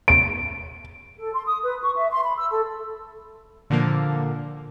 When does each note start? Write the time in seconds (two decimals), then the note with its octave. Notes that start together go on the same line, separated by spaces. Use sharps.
0.08 D7
1.17 A4
1.33 C6
1.46 D#6
1.63 B4
1.82 C#6
1.95 E5
2.10 C6
2.23 B5
2.36 E6
2.50 A4
3.70 A#2 D3 F3 A#3